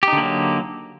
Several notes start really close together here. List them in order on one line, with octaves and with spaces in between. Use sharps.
G4 D#4 D3 A#3 F#3